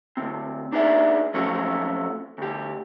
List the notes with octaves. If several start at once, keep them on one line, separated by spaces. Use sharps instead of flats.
D2 C4
D4 D#4 G#4 B4 D5 E5
F3 F#3 A3 C4 C#4 F#4
D2 G4